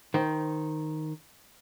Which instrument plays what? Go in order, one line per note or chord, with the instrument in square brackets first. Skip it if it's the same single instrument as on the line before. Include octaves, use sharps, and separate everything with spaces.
[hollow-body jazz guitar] D#3 C5